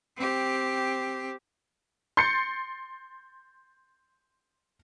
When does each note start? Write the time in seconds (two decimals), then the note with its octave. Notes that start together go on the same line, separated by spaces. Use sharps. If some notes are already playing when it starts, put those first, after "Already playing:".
0.17 C4 G4
2.17 C6 G6 A6 C7 C#7